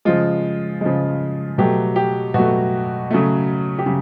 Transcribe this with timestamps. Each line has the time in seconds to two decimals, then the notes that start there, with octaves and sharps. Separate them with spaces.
0.05 C#3 F3 G#3 F4
0.81 C#3 F3 G#3
1.58 B2 F#3 A3 G4
1.96 G4
2.34 B2 F#3 A3 F#4
3.11 C#3 F#3 A3
3.79 G4
3.86 C#3 F#3